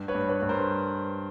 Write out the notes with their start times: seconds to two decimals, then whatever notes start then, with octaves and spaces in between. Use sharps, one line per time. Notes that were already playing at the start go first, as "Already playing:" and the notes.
Already playing: G2
0.08 B4 C#5
0.15 G2
0.29 B4 C#5
0.42 G2
0.49 A#4 C5